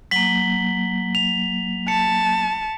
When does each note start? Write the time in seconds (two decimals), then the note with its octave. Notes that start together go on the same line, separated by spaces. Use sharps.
0.11 F#3 A#3 B6 F#7 G7
1.15 F7
1.88 A5 C#7